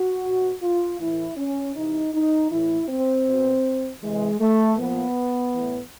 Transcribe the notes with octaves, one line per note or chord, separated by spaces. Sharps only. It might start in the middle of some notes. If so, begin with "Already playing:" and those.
Already playing: F#4
B2
F4
A2 E3 E4
C#4
C3 E3 D#4
D#4
A2 E3 E4
C4
B2
C3 E3 G#3
A3
A#2 F3 B3
A2 E3